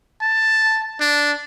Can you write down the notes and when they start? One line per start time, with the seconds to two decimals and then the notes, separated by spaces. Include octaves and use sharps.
0.21 A5
1.00 D4